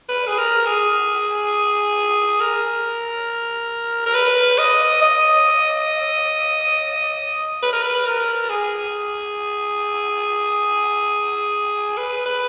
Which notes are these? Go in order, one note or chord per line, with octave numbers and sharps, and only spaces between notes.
B4
G#4
A#4
G#4
A#4
A#4
B4
D#5
D#5
B4
A#4
B4
A#4
G#4
B4
B4